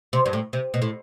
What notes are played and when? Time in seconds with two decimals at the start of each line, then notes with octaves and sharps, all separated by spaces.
0.13 C3
0.26 G2
0.33 A2
0.53 C3
0.74 B2
0.82 A2